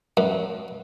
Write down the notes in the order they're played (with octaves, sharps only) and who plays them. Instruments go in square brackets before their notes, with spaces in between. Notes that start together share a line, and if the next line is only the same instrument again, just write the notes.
[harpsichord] F#2